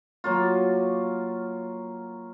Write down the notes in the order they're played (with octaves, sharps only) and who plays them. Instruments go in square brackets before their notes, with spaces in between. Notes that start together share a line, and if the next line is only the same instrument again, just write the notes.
[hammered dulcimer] F#3 A#3 F4